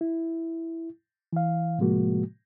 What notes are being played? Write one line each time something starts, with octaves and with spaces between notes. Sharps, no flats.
E4
E3 F5
A2 C3 F3 G#3 A#3 F#4